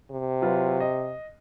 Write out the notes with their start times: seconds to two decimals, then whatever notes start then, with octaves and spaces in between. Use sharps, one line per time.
0.11 C3
0.42 F#3 F4 B4
0.80 D#5